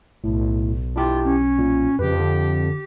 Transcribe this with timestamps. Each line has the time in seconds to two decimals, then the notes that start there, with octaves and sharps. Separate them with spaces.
0.24 B1 A2
0.96 D4 E4 F4 G4
1.24 C#4
1.59 A#2
1.99 F2 C#3 G4 B4
2.19 D3